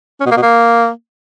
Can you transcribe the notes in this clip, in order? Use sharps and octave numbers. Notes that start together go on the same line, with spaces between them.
C#4
B2
A#3
B2
A#3